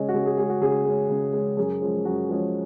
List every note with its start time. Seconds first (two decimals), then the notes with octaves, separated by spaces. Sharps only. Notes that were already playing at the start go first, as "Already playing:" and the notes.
Already playing: C#3 G#3 C#4 G#4 D#5
0.09 F#4
0.14 C#3 G#4
0.26 G#4
0.38 G#3 C#4 G#4
0.50 F#4
0.61 C#3 G#4
0.86 G#3 C#4
1.10 C#3
1.33 G#3 C#4
1.57 F#2 G#4
1.81 F3 G#3 C#4
2.05 F#2 F#4
2.29 F3 G#3 C#4